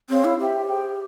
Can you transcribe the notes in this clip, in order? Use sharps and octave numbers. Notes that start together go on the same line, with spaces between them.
C4 G#4 C#5 F5
E4
G4 C5 E5 G5
G#4 C5 G5